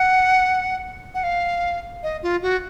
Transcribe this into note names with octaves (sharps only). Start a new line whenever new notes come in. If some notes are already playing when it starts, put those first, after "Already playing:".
Already playing: F#5
F#5
F5
D#5
F4
F#4